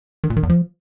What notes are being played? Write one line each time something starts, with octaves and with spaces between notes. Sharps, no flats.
D#3
A#2
D#3
E2
F3